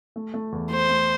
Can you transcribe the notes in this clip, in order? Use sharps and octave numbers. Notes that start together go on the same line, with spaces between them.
A3
A3
E2
A3 C5
A3